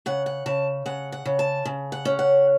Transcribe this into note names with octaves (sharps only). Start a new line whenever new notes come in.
C#3 F#5
F#5
C#3 A5
C#3 F#5
F#5
C#3
A5
C#3
F#5
C#4
F#5